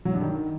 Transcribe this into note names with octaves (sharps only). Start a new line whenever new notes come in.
F#3
G2
D#3